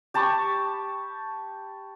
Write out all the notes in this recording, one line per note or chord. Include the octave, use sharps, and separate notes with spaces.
G4 A5 B5 C#6